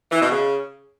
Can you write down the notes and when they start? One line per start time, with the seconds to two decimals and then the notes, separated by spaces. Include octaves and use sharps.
0.11 E3
0.20 B2
0.30 C#3